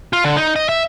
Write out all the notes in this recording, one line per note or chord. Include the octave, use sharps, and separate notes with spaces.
F4
D3
D#4
D#5
E5